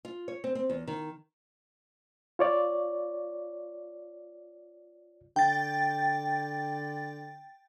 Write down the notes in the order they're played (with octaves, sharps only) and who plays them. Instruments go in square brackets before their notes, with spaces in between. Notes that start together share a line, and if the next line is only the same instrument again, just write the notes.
[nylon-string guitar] F4
C#5
C4
C4
E2
D#3
[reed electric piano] F4 C#5 D5
[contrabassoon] D3 [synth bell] G5 A6